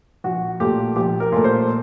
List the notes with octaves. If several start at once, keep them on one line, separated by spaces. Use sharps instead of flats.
A#1 F#4
A#2 A3 G4
A#1 G4
A#4
A#2 A3
C5